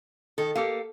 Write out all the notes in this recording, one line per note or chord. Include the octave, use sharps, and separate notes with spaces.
D#3 A4
A#3 G4 A4 F5